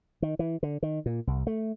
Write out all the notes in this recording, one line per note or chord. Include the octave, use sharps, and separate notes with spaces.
D#3
E3
D3
D#3
A#2
C2
A3